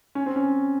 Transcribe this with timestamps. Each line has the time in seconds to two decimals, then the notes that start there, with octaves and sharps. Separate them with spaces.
0.15 C#4
0.26 C4
0.36 C#4